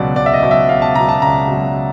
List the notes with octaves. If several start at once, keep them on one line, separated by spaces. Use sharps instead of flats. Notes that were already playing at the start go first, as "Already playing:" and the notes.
Already playing: C#2 B2 F#3 D5
C#2 D5
E5
D#5
B2 F#3
E5
C#2 F5
A5
B2 F#3 A#5
A5
C#2 A#5
B2 F#3